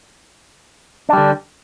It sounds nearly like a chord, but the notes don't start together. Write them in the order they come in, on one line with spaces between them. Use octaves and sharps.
D4 G3 D3